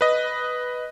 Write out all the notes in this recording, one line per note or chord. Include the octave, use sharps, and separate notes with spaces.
B4 D#5